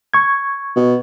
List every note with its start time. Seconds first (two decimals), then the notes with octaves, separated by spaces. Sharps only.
0.14 C#6 G#6
0.76 B2